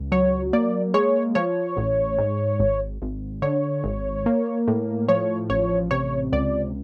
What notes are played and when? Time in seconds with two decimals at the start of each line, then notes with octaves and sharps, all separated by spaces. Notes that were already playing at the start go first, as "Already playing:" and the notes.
Already playing: C#2
0.12 F#3 C#5
0.53 A#3 D5
0.94 G#3 C#5
1.35 F3 C#5
1.77 A1
2.18 G#2
2.60 G#1
3.02 G#1
3.42 D3 C#5
3.84 G#1
4.26 A#3
4.67 A2
5.08 F3 C#5
5.50 A1 C#5
5.91 C3 C#5
6.32 C#2 D5